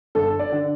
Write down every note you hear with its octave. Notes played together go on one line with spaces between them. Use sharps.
G1 A4
D5
D3